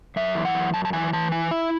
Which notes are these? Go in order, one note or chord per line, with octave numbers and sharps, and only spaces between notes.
F#2 E5
E3
F#5
F#2
F#2 A5
A5
E3 G#5
E3 A5
E4 G#5
E4 E5